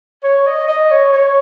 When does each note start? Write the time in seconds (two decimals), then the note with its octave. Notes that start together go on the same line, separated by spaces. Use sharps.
0.24 C#5
0.47 D#5
0.68 D#5
0.91 C#5
1.13 C#5